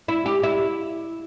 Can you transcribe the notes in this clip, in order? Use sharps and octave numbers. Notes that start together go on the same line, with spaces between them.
E4
G4
E4